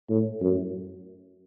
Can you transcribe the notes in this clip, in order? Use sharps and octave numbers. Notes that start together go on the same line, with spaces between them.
A2
F#2